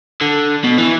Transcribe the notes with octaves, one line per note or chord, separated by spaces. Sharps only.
D3
B2
E3